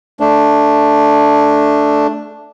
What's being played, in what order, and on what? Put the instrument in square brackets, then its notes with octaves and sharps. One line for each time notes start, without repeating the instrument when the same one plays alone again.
[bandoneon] A3 D4